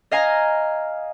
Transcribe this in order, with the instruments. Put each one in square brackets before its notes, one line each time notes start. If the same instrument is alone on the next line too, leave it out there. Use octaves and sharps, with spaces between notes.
[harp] D#5 F5 G#5 A#5